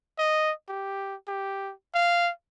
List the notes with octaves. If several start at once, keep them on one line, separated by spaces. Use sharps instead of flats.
D#5
G4
G4
F5